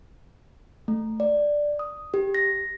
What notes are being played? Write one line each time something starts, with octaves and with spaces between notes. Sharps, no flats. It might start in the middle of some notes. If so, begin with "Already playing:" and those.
A3
D5
D#6
G4
A#6